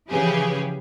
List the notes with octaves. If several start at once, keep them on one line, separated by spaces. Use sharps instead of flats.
C#3 E3 F3 G4 G#4 B4